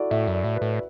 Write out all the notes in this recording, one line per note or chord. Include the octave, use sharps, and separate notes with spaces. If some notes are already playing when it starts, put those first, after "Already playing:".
Already playing: E4 F#4 A4 D5
A2 E5
F#2
D5
A2
B4
A2
B4